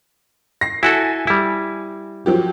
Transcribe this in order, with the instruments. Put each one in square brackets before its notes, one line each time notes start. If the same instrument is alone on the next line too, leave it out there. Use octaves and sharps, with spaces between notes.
[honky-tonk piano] A#6 C7
[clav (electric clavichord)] E4 F#4 A4 [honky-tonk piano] G#5
[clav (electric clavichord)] G3 E4
[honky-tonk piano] F3 F#3 G4